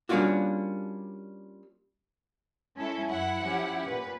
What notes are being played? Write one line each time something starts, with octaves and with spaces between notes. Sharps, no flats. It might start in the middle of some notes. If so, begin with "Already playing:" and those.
G3 A#3 C#4 D4 F4 F#4
G#3 C#4 E4 A4
F#2 E4 F#5
F3 C#4 G4
A#2 B4